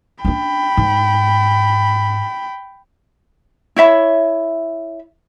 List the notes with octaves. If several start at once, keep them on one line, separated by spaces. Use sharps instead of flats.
C#4 D4 G5 B5
G#2
E4 C#5 E5 B5